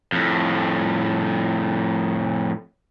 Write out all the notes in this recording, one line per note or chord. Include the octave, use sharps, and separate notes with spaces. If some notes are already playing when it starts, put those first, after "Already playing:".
F2 A2